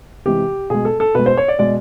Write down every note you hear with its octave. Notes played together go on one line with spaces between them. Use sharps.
C3 E3 G#3 G4
B2 G#3 G#4
A4
A4
B2 G#3 B4
C5
C#5
D5
B2 G#3 D5